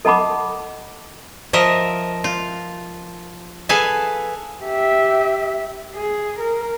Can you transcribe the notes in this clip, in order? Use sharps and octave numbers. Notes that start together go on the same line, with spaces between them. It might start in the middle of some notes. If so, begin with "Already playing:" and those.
A4 D#5 F#5 A5 B5 D6
F3 A#4 D#5 E5
F4
G#4 A4 B4 F5 G#5 A5
G4 E5
G#4
A#4